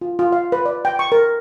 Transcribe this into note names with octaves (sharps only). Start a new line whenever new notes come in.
F4
F4
F5
B4
D5
G5
C#6
A#4